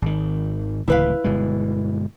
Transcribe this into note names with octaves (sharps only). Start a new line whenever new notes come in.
G#1 D#3
D1 C#2 E3 E4 B4 F5
G1 B2 G#3